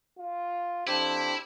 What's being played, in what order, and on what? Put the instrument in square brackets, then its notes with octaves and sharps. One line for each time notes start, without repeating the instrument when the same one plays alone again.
[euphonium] F4
[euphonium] F2 [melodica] D4 G4 C5 [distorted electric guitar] E4